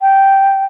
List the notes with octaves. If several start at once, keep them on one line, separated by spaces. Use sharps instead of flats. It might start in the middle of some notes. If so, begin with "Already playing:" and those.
G5